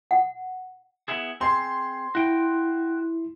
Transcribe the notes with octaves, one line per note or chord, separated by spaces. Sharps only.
F#5
B3 E4 G#4
C4 G#4 C6
E4 F#4 G5